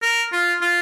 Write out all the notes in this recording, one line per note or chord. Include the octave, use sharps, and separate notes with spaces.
A#4
F4
F4